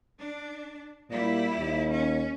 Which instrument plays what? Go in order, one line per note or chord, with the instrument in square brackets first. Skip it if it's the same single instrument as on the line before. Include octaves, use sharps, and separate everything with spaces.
[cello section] D4
[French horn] A#2 [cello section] G3 E4
[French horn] D#2
[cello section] C#4